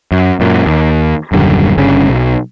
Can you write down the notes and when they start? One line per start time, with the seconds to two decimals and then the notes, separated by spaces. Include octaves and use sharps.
0.12 F#2
0.40 F#2 A#2
0.66 D#2
1.32 D#1 F#2 D3 G3
1.77 G1 G2 C#3 C#4
2.09 B1